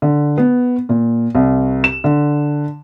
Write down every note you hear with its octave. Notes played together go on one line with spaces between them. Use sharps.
D3
B3
A#2
C2
E7
D3